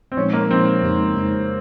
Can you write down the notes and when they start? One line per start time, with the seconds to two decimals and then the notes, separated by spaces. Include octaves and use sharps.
0.12 C4
0.17 A#2 F3 G#3 C#4 D#4
0.33 A#3
0.50 A#2 F3 G#3 C4 D#4
0.83 F2 C#3 G#3 D#4 G4
1.16 F2 C#3 G#3 D#4 G4